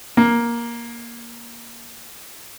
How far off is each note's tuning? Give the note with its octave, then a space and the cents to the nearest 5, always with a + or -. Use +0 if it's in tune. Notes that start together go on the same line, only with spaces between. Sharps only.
A#3 +10